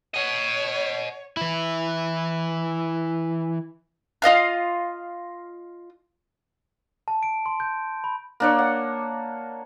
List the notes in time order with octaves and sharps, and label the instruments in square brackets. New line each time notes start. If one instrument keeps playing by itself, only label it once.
[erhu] C#5 [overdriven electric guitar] D#5 F#5
[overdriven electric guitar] E3 E4
[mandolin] F4 D#5 F5 F6
[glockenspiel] A5
D7
C6
G6
B5
[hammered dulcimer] A#3 D4 C#5
F#5